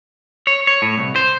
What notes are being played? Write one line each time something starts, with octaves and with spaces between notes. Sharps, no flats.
C#5
C#5
A2
C2
C5